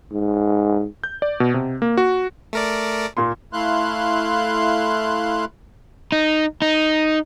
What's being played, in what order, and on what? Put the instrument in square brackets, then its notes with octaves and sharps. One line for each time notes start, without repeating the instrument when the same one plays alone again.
[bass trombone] G#2
[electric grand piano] G6
D5
B2
C3
A#3
F#4
[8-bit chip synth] A3 A#4 D5
[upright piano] A#2 A#3 C6
[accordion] A3 E4 F5 C6 F#6
[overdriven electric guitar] D#4
D#4